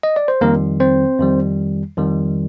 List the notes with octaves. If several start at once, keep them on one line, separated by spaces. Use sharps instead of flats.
D#5
D5
C5
F2 D#3 G3 A#3 A#4
C4 C5
F2 D#3 G3
F2 D#3 G3